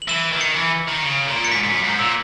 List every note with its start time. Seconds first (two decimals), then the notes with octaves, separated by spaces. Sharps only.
0.02 F#7
0.08 E3 E7
0.33 D#3
0.41 C#7
0.56 E3
0.88 D#3
1.04 C#3
1.28 A#2
1.45 C#7
1.52 G#2 B6
1.63 G#2
1.68 F#2
1.84 G#2
1.99 A#2 E6